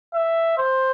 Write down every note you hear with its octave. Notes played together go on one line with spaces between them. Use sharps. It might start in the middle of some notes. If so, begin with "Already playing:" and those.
E5
C5